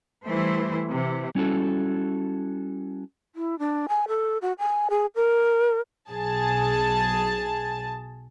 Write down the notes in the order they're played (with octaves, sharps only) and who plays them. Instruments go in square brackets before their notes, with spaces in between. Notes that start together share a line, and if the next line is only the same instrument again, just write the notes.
[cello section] E3 G3 A3 E4 C5
C3 E3
[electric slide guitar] G3 C#4 E4 F#4 A4
[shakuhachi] E4
D4
G#5
A4
F#4
G#5
G#4
A#4
[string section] B1 G#4 A5